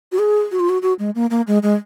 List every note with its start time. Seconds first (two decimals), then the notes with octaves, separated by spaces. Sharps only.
0.12 F#4
0.19 G#4
0.51 F#4
0.60 F4
0.69 F#4
0.82 F#4
0.99 G#3
1.15 A#3
1.30 A#3
1.47 G#3
1.63 G#3